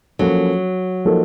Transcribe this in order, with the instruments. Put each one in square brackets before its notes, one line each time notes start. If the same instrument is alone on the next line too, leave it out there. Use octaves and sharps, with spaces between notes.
[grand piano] F3 A#3 C#4 A4 [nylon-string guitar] F#3
[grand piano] F3 A#3 D#4 A4